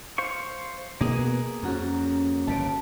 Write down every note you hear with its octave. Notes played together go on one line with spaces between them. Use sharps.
C5 F5 C#6
B2 A#3 B3 G#4
F2 C#4 F#4 A#4
G1 F#2 C#3 A5 B6 D7